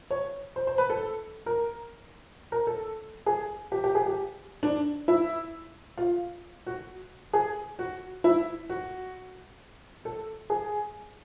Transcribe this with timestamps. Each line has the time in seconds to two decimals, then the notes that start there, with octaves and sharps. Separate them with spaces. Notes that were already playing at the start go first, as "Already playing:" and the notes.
0.11 C#5
0.56 C5
0.67 C5
0.78 B4
0.90 A4
1.46 A#4
2.52 A#4
2.67 A4
3.26 G#4
3.72 G4
3.84 G4
3.95 G#4
4.06 G4
4.63 D4
5.08 E4
5.98 F4
6.67 F#4
7.33 G#4
7.79 F#4
8.24 E4
8.70 F#4
10.05 A4
10.50 G#4